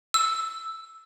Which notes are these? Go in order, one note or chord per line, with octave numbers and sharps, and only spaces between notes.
E6